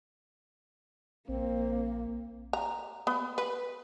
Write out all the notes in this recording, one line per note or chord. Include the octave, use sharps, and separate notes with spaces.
A#1 A#3 C4
A#5
B3
B4